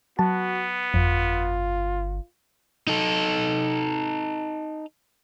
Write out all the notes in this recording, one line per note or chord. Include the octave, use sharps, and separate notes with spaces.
F#3 B3 F#4 A5
G1 F2 F4
D#4 A4